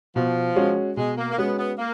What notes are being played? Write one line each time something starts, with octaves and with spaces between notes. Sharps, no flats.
B2 F3
G#3 C#4 F#4
B2 G#3
A#3
A#3
G#3 B3 C#4 F#4
B3
A#3